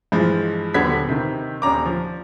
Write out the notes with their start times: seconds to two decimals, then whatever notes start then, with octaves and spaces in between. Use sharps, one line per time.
0.12 G2 E3 F3 G#3
0.74 D#1 D3 F#3 B3 G#6 B6
1.09 C3 D#3
1.62 D#1 C#4 D4 A#5 D6
1.86 F3